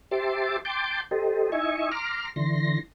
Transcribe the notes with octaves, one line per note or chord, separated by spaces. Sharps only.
G4 C5 E5 A5 C6 D6
G5 A5 C6 D6 G6
G4 A4 C5 D#5
D#4 E4 D#5 E5 G#5 C#6
A#5 C6 D6 F6
D3 E3 C6 A#6